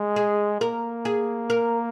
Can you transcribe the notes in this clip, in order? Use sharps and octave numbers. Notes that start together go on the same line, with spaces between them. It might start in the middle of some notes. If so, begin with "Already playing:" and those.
Already playing: G#3
G#4
A#3 A#4
G#4
A#4